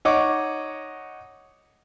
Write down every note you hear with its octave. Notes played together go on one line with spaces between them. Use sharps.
D#4 C#5 D#5 F#5 C#6 D6